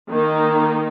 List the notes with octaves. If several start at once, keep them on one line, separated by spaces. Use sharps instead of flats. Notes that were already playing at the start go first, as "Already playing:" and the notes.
D#3 A#3 D#4